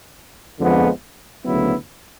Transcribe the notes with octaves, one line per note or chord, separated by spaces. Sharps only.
F2 D3 F3 G#3 B3
D2 C#3 F#3 B3 E4